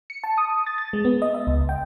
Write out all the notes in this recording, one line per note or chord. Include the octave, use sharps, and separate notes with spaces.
C#7
A5
D#6
A6
A6
G#3
B3
D#5
E5
C#2
G5